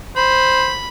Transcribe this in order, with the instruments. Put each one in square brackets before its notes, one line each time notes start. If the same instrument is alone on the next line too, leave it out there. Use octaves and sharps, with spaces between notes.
[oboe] C5 [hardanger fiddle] B5